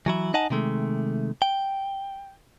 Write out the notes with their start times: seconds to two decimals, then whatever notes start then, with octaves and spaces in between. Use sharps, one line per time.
0.06 E3 F#3 E4
0.34 D#4 D#5 F#5 G#5 A5
0.50 C3 D#3 G#3 A3
1.42 G5